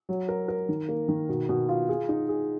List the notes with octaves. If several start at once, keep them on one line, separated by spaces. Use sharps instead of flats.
F#3
A#4
A#4
D#3
A#3
D#3
B2
B2
F4
G#4
D#4
G#4